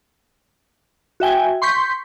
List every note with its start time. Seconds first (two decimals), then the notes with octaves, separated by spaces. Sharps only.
1.20 F#4 E5 G5 G#5
1.62 C6 C#6 G6 B6